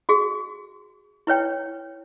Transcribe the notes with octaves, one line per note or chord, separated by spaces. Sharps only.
F#4 G#4
E4 B4 C#5 G5